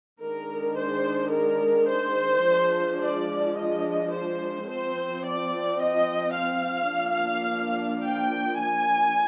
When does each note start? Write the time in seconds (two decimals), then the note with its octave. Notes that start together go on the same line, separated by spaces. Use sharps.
0.20 D#3 G#3 D4 A#4
0.76 C5
1.32 A#4
1.89 C5
2.44 F3 G#3 D4
3.00 D5
3.56 D#5
4.12 C5
4.68 F3 C4 C5
5.24 D5
5.81 D#5
6.36 F5
6.93 F3 A#3 D4
8.04 G5
8.60 G#5